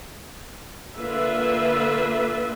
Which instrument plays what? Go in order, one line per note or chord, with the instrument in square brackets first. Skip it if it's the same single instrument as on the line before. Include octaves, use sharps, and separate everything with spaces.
[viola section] D3 A#3 F4 B4 E5